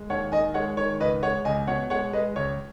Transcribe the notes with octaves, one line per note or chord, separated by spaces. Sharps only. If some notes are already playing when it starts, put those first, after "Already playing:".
Already playing: G#3
D#2 C#5 F#5
D#3 D#5 G#5
G#3 C#5 F#5
D#3 C#5
C#2 B4 D#5
G#3 C#5 F#5
C#2 D#5 G#5
B2 C#5 F#5
G#3 C#5 F#5
G#3 B4 D#5
C#2 C#5